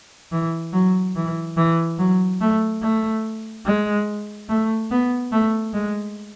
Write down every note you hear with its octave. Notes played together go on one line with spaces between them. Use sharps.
E3
F#3
E3
E3
F#3
A3
A3
G#3
A3
B3
A3
G#3